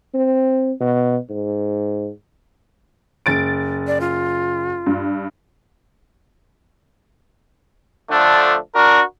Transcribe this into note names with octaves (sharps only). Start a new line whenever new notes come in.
C4
B2
G#2
F#1 A6 D7
D5
F4
G2
D3 F3 A3 D4
D4 F#4 A#4